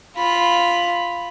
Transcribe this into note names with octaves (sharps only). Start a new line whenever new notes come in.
F4 B5